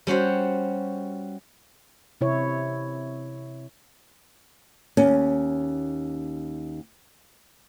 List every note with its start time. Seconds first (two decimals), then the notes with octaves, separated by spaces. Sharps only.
0.07 G3 C#4 F#4 C5
2.21 C3 E4 C#5
4.97 D#2 C#4